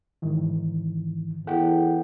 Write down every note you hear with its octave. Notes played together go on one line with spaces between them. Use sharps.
G#2 D#3 E3
E2 A4 F#5 G5